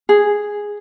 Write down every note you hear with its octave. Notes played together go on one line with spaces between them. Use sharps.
G#4